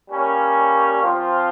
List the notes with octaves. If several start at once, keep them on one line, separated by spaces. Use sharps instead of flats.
G3 A#3 C#4
F3 C4 F4